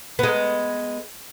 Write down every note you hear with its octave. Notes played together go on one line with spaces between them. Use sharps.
G#3 B3